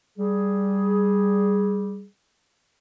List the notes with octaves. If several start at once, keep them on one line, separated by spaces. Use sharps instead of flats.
G3 G#4